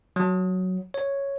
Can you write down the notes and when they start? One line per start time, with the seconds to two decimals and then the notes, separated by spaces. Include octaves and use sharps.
0.16 F#3
0.94 C#5